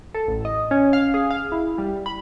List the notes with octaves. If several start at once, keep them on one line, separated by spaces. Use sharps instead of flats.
A4
A1
D#5
C#4
F5
G#4
F5
E4
G3
B5